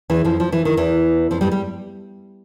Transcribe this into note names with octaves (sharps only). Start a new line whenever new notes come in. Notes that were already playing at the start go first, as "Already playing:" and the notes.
E2 E3
F2 F3
F3
E3
D#3
E2 E3
F2 F3
G2 G3
G3